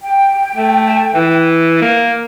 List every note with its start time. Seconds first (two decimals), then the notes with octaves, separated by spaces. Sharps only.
0.02 G5
0.56 A3
1.14 E3
1.82 A#3